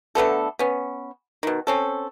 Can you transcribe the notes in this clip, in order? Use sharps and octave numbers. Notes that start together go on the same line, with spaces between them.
D3 A3 B3 A4
B3 C#4
B2 D#3
C4 C#4 A4